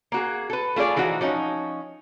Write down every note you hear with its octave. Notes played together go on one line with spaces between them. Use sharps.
A#3 F#4 G#4
A4 B4
A3 F4 G#4 D5
E3 F3 D#4 F#4
F3 C#4 D#4